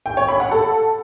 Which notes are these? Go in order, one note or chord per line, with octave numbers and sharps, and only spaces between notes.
G5
C#5
B5
F#5
A4